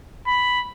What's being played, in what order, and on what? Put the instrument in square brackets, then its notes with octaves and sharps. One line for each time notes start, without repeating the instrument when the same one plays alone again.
[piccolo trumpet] B5